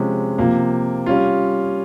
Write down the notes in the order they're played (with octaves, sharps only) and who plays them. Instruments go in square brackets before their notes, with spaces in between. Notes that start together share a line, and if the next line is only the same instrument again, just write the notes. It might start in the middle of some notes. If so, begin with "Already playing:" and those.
Already playing: [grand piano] C3 F3 G#3 C#4
C3 F3 A#3
G3 C#4 F4